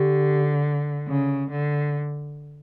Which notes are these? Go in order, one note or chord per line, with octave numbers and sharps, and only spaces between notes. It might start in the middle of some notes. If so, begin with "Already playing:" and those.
Already playing: D3 G4
C#3
D3